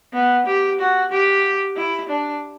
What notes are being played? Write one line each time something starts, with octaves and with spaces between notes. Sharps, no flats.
B3
G4
F#4
G4
E4
D4